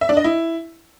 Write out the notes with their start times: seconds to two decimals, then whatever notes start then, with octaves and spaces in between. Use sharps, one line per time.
0.01 E5
0.09 D4
0.17 D#5
0.24 E4